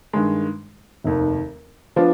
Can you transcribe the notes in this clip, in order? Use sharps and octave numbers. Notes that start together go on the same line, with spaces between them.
G2 D#3 G#3
F1 D#2 D#3
F3 B3 D4 F4